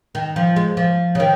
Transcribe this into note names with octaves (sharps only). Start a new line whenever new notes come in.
D#3
F3
G#3
F3
C#3
D#3